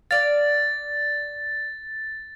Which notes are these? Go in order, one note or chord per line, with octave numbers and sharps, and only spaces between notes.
D5 F5 A6